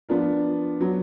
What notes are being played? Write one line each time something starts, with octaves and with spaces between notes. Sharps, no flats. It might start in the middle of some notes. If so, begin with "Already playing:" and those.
F3 B3 D4 F4 A#4
F#3 B3